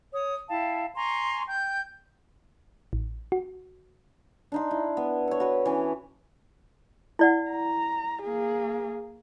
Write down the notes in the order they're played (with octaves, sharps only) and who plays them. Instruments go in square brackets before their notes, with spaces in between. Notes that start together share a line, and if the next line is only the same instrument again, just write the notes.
[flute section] C#5 D#6
E4 F5 G5 A5
G#5 A#5 C6 C#6
G5 G6
[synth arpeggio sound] A1
F#4
[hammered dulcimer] D4 D#4 C6
E4
B3
A4 C#5
F#4 B4
E3 C#4
[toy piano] E4 D5 F#5
[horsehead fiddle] A#5
A#3 G#4